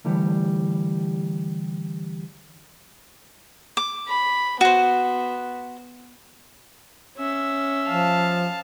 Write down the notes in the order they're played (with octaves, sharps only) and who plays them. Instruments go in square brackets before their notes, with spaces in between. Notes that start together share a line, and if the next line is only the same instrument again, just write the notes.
[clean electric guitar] D3 E3 G3 A3 G4
[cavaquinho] D6
[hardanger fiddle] B5
[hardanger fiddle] B3 [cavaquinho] F#4 C5
[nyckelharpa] C#4 E5
[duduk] F3 [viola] F5 A5